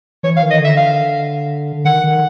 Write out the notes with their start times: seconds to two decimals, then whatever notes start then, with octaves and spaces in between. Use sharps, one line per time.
0.23 E3 C#5
0.37 F5
0.42 D#3
0.51 D#5
0.59 D3
0.65 E5
0.77 F5
1.85 D#3 F#5
2.04 D#3